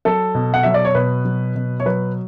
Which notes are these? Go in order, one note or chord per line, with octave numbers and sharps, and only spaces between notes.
F#3 A4
B2
F#5
F#3 E5
D5
C#5
B2 B4
F#3
B2
C#5
F#3 B4